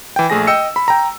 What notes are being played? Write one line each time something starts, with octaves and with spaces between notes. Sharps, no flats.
E3 G5
A#1 A3 G#4 G#5 A#6
D#5 G5 E6 C#7
B5
G5 A#5